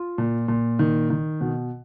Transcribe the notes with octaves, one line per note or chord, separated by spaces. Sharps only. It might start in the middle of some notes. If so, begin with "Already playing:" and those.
Already playing: F4
A#2
A#2
D#3
D#3
B2